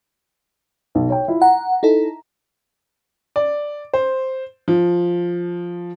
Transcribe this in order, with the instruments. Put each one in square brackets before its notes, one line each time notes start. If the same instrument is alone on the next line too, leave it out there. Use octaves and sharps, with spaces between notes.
[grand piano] B1
C#5 G5
E4 F4
[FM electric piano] F#5 [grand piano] A#5
[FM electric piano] D#4 E4 A4
[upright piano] D5
C5
F3